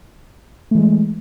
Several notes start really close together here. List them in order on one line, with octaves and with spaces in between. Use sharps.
A3 E3 G#3